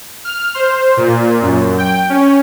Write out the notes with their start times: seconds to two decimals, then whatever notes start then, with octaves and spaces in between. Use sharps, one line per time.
0.25 F6
0.54 C5
0.97 A#2
1.42 F#2
1.78 G5
2.10 C#4